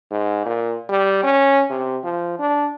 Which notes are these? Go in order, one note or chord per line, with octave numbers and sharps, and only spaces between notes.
G#2
A#2
G3
C#4
C3
F3
D4